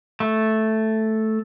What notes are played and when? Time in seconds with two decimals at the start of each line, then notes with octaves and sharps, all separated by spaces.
0.20 A3